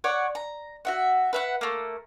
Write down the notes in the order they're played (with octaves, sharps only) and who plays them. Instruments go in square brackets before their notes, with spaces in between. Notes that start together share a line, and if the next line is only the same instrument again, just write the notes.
[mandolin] C#5 D5 F#5 C#6
A#5
F#4 E5 F#5
B4 E5 F#5
A3 A#3